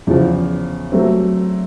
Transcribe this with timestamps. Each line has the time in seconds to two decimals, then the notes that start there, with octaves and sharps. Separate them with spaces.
0.07 E2 C#3 F3
0.92 F#3 A3 C4